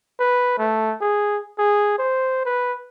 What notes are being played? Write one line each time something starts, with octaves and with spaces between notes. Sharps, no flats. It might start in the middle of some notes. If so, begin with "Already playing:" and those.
B4
A3
G#4
G#4
C5
B4